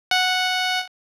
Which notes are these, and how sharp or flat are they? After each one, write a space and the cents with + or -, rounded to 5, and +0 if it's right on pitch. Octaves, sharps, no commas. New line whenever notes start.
F#5 -5